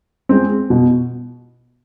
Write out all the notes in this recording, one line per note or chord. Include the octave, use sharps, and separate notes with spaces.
G#3 C4
B2